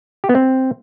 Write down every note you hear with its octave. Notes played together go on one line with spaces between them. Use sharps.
G4
B3
C4